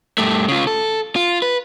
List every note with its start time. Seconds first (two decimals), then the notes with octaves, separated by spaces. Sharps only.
0.18 G2 A3
0.48 C#3 F4
0.67 A4
1.16 F4
1.42 B4